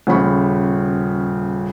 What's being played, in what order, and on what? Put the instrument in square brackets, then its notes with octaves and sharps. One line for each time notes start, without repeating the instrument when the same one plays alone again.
[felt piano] D#1 C#3 B5 C#6